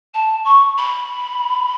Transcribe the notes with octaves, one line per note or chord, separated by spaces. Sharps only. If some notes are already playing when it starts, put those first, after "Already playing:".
A5
C#6
B5